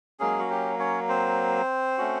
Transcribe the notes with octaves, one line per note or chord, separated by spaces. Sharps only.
F#3 G#3 A#3 C#4 G#4
F#4
G4
C#4 C#5
C4 C5
A3 C#4 F#4